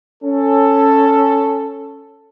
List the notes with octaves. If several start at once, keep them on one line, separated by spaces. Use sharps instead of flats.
C#4 A4